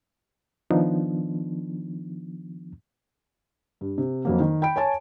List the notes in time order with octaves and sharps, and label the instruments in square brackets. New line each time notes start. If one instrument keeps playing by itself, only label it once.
[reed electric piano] D#3 F3 B3 D4 D#4
[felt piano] G2
C3
F2 F#3 A#3
D#3
G5 B5 D7
C#5 G#5 A5